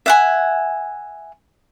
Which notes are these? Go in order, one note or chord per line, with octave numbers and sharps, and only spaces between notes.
E5 F#5 G#5